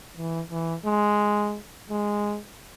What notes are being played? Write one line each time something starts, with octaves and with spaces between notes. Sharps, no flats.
E3
E3
G#3
G#3